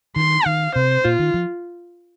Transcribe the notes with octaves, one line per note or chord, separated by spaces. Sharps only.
D#3 C6
D#3 F5
C3 C5
A#2 F4
D#3
F3